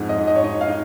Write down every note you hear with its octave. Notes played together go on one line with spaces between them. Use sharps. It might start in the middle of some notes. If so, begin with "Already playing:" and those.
Already playing: F2 G#2
D#5
G#2
D#5
C#5
D#4 D#5
F5
D#4